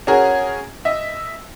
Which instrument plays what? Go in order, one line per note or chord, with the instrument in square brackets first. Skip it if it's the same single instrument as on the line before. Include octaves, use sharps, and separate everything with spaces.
[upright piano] C#4 F#4 G#4 A#4
D#5 E5